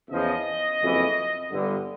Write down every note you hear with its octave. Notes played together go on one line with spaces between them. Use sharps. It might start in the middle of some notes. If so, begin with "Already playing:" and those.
E2 C#3 F3 D#5
F#1 F2 C#3 E3
G1 G2 D3